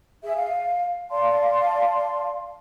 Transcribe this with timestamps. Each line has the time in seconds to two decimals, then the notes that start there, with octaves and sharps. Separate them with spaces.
0.23 G#4 E5
0.35 F5
1.11 D5 F5 A5 C6